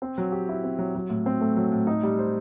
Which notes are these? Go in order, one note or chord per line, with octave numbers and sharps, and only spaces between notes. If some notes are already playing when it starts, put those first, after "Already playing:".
C4
F#3
G4
E4
C4
F#3
F#3
A2
C4
A3
F#3
A2
D#4
G3
C5